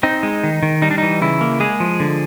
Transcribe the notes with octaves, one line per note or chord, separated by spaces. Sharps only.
C4 D#4
G#3
D#3
D#3
G3 D#4
D4
E3 D#4
C#3 E4
A#3
G#3 G#4
F3
D3